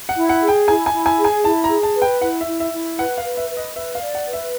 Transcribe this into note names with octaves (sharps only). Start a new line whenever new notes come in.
F#5
E4
F#5
G#4
G5
E4 G#5
G#5
E4
G#5
G#4
G#5
E4 A5
A#5
G#4
A5
B4
G5
E4 F#5
E5
E4
E5
E4
B4 F#5
F5
B4
E5
B4
D#5
B4 E5
F5
D5
F#5
B4
E5